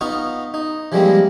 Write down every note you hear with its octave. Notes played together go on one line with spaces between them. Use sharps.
B3 D#4 F4 C#6
D#4
E3 F3 G3 G#3 A#3 C4